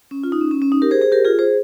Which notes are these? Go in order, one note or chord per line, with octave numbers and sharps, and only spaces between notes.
C#4
F4
D#4
C#4
C#4
C#4
D#4
G4 A#4
G#4 C5
G#4 C5
G4 A#4
F4 G#4
G#4 C5